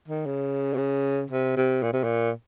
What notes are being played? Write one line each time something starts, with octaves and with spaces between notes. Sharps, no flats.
D#3
C#3
C3
C#3
C3
C3
A#2
C3
A#2